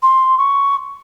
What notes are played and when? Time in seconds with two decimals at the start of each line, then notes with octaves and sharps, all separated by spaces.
0.02 C6
0.38 C#6